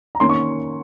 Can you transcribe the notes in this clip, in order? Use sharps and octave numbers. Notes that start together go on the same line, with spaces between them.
A#5
D#3 A#3 C#4 C6
C#6